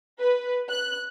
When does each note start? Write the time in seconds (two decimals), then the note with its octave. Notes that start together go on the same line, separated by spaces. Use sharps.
0.21 B4
0.69 F#6